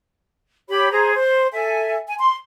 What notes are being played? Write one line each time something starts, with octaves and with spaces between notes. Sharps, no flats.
G4 C#5 B5
G#4 C5 A#5
C5
A4 E5 G#5
G#5
C6